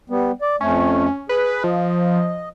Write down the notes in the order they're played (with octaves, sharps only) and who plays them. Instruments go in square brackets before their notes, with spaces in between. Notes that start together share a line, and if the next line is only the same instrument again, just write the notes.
[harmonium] G3 B3
D5
[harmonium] F2 A3 [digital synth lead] C#4
[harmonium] G#4 [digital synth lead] B4
[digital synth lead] F3 [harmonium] D#5